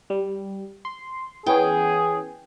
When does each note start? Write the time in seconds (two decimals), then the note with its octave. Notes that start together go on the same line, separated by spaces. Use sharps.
0.10 G3
0.85 C6
1.46 E3 B3 C#4 G#4 G5